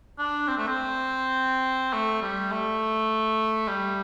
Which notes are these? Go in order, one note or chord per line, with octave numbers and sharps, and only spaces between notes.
D4
C4
A3
C4
A3
G3
A3
G3